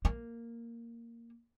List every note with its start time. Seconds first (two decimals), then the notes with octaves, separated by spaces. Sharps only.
0.05 A#3